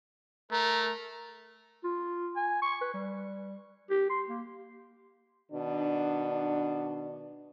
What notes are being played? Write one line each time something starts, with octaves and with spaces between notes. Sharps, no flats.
A3 A#4 A#5
F4
G#5
C#6
B4
G3
G4
C6
A#3
B2 D#3 D4